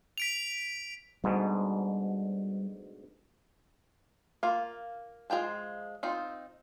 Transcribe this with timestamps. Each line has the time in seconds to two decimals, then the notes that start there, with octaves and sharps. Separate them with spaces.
0.18 B6 D7 F7
1.24 D2 G#2 B2 G3
4.43 A#3 F4
5.30 F3 G#3 F4 G5 A5
6.03 C4 D#4 F4